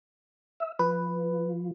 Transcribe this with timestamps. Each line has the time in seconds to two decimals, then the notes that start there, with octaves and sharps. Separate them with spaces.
0.60 E5
0.79 F3 B4